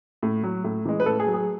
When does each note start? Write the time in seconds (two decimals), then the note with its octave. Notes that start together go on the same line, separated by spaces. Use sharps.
0.23 A2
0.43 F#3
0.64 A2
0.85 E3 G#3
1.00 B4
1.06 A2 A4
1.20 G#4
1.27 F#3
1.34 G#4